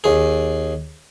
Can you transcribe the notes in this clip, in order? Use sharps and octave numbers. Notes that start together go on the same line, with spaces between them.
D#2 G#4